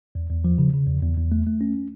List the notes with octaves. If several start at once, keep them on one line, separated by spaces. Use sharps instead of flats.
E2
E2
F3
C#3
C#3
E2
E2
E2
A3
A3
C#4